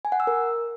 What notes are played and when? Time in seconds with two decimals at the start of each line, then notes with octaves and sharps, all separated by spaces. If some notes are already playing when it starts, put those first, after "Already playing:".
0.05 G#5
0.12 F#5
0.20 E6
0.27 A#4